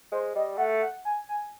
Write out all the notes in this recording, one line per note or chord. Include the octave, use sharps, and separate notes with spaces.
G#3 C5
G3 D#5
A3 F#5
F#5
G#5
G#5